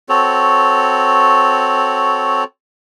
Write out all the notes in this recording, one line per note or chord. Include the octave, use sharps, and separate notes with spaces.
C4 F#4 A4 C#5